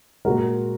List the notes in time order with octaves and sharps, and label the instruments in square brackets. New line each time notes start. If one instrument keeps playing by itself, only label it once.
[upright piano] A#2 G#3 F#4 A#4